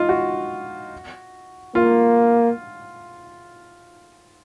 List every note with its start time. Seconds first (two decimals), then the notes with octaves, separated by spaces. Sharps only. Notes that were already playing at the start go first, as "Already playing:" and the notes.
Already playing: D#4 F4
0.09 F#4
1.75 A#3 F4